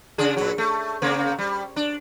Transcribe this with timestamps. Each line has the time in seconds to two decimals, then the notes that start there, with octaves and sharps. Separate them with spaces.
0.18 C#3 D4 G#4
0.37 A#2 F#3
0.58 A3
1.02 C#3 A#3 C4
1.39 G3
1.76 D4